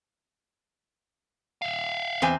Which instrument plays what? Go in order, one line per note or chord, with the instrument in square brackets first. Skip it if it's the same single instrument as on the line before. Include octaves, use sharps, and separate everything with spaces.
[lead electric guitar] E5 F5
[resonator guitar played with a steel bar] E2 C4 G#5